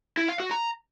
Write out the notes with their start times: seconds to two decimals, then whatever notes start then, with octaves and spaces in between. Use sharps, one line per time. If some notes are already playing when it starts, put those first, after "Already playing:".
0.17 E4
0.29 F5
0.40 F#4
0.51 A#5